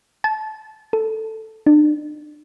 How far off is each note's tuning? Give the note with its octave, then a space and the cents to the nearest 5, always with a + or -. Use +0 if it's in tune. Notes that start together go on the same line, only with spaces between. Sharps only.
A5 -25
A4 +5
D4 +40